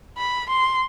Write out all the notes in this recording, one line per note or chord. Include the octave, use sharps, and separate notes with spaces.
B5
C6